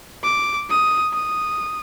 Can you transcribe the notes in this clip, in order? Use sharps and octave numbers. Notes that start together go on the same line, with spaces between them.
D6
D#6
D#6